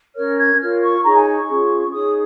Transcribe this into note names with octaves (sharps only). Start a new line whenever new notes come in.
C#4 A#4 C#5 F6
G#6
F4 A#4 C#5 F6
C#6
D#4 G#4 C#5 A#5
G#5
C#6
C#4 F4 G#4 C#5
D#4 G#4 C#5 D#6